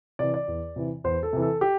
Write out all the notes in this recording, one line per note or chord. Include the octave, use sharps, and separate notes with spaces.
C3 E3 D5
D5
E2
C3 E3
E2 C5
A4
C3 E3
A4
G4